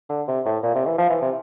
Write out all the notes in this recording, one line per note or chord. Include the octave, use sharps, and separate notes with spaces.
D3
C3
A2
A#2
C3
E3
F3
E3
C3